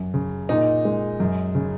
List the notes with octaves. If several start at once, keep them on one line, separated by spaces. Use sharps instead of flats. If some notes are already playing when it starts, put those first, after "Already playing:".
Already playing: F#2
C#3
A#2 D#4
G#3
F#2
C#3